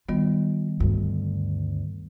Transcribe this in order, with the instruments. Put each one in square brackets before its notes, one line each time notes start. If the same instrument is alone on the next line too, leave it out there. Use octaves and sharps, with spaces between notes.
[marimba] D#3 G3 B3 [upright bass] F4
[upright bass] D2 G2